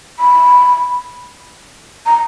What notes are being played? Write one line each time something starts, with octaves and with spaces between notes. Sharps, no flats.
B5
A#5